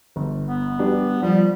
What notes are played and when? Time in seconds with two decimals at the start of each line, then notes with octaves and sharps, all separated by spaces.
0.16 G1
0.47 B3
0.79 G3 D4 B4
1.22 F3 G3